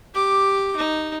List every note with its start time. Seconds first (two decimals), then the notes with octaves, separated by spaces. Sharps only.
0.14 G4 D6
0.76 D#4